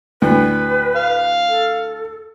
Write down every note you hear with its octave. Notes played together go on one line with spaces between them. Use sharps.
D2 A2 B4
F5
A4